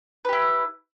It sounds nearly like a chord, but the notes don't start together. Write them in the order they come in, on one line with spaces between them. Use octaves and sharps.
B4 G4 E4